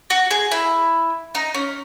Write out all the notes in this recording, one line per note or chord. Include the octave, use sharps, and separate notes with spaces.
F#4
G#4
E4
D#4
C#4